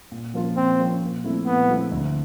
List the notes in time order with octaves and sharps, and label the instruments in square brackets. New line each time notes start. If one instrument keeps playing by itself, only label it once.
[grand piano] A#2
F3 A#3 C#4 F4
[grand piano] A#2 [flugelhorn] C4
[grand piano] F3 A#3 C#4 F4
A#2
F3 A3 C4 E4
[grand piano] A#2 [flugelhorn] B3
[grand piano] F3 A3 C4 E4
D2